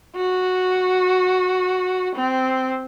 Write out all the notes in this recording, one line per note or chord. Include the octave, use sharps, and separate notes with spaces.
F#4
C4